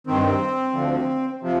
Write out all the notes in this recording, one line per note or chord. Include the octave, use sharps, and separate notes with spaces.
G2 D#3 C4
D2 D3 F3
C3 F3